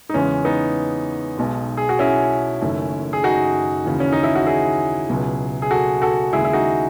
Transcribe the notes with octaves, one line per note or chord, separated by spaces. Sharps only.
D#4
E2 C#3 E3 G#3 C#4
B3 D#4
B1 B2 G#3
G#4
F#4
C#4 E4
F#1 F#2 D#3 A3
G#4
D#4 F#4
D#2 C#3 E3
C#4
D#4
E4
F#4
E4 G#4
C#2 B2 F#3
G#4
F#4 A4
F#4 A4
D#2 C#3 G#3 E4 G#4
E4
D#4 F#4